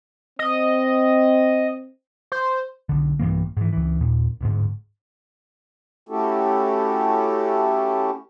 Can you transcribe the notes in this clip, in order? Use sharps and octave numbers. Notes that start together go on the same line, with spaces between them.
C4 D#5
C5
B1 D3
B1 G2 E3 A#3
G#2 E3
C#2 E3
D#2 A#2
D1 D2 G#2
A3 C#4 E4 F#4 G4 A4